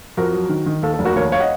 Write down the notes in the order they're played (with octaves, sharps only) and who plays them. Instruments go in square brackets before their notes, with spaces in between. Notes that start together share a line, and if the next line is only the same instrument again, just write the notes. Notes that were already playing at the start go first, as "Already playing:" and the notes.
[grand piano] F2 F#4 A#4
F#3
D#3
D#3
D#2 A4
A4
F1
F#4 A#4
D#2 A#4 C#5
C#5 F5
D#5 F#5